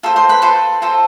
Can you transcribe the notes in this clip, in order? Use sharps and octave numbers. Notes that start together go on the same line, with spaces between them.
F4 A4 C5
C5 C6
B4 B5
F4 A4 C5 C6
F4 A4 C5